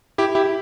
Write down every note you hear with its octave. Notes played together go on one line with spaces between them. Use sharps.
E4 G4
E4 G4